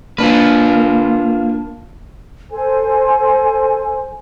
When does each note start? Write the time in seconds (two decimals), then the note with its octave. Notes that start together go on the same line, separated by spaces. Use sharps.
0.18 A#3 D4 F4 B4
2.51 A4 C5 G#5